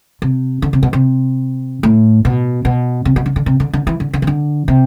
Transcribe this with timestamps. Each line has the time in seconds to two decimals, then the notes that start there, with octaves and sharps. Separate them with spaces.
0.22 C3
0.62 D3
0.73 C3
0.83 B2
0.93 C3
1.83 A2
2.25 B2
2.65 B2
3.05 C3
3.16 B2
3.26 D3
3.36 D3
3.46 C3
3.60 D3
3.73 D3
3.87 E3
4.00 D3
4.13 D3
4.22 C3
4.27 D3
4.68 C3